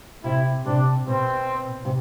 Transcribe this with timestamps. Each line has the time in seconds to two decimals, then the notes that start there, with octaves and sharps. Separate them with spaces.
0.24 C3 E4
0.65 C3 D4
1.07 B2 C4
1.85 C3